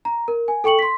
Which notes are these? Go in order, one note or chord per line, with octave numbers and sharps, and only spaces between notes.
A#5
A#4
G#5
A4 G5 C#6 C#7 F#7
C6 B6